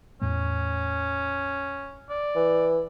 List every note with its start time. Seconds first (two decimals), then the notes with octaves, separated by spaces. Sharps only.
0.22 E2 A2 A3 C#4
2.10 D5
2.35 E3